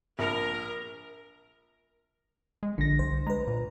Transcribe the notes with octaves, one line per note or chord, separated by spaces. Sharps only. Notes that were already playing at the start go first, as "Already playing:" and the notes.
A#1 A#4 B5 F7
G#3
A#1 D3 A#6
C2 C5
G#3 B4 A#5
A#2